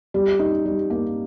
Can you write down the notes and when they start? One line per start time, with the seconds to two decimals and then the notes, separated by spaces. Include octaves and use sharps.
0.14 G3
0.39 D#4
0.66 G3
0.90 A#3